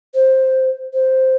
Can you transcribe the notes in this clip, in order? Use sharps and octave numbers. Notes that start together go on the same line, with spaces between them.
C5
C5